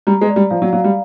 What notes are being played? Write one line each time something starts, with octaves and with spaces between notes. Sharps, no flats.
G3 A#5
G#3
D5
G3
F3 F5
F#3
F#3 F5
G3